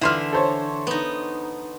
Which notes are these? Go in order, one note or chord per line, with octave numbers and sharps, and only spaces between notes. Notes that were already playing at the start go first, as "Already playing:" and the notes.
D3 E3 D4 E4 C6 F6
A4 C5 C#5
B3 D#4